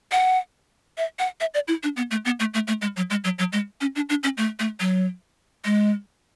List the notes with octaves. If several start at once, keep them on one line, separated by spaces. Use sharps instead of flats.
F#5
E5
F#5
E5
D5
E4
D4
B3
A3
B3
A3
A3
A3
G#3
F#3
G#3
F#3
F#3
G#3
C#4
D4
D4
C#4
A3
A3
F#3
G#3